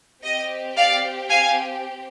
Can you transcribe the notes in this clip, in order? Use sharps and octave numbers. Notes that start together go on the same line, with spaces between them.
C4 G4 D#5
D5 F5
F5 G#5